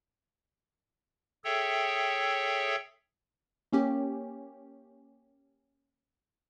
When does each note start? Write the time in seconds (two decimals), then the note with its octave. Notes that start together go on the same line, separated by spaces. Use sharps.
1.44 G#4 A4 C#5 E5 G5
3.73 A#3 C#4 G4